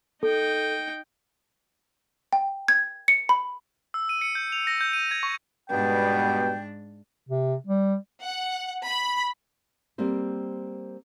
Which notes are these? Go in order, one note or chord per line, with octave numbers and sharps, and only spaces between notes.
D#4 A4 G5
G5
G#6
C#7
B5
E6
D#7
C#7
G6
F7
A#6
G6
D#7
G#6
C#6
G#2 B2 G3 B3 D4 G5
C3
G3
F#5
B5
G3 A#3 C4 C5